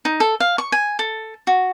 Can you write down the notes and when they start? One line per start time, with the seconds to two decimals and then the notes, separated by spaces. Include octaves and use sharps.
0.05 D#4
0.20 A4
0.40 F5
0.58 C#6
0.72 G#5
0.99 A4
1.47 F#4